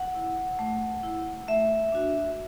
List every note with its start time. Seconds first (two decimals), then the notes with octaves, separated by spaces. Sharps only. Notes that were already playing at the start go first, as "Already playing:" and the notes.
Already playing: F#5
0.15 E4
0.59 A3
1.03 E4
1.48 A3 E5
1.92 D4 F#4